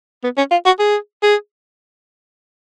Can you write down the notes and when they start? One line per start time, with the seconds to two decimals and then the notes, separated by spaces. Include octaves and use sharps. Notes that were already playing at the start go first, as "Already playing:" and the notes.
0.24 B3
0.38 C#4
0.51 F4
0.66 F#4
0.79 G#4
1.23 G#4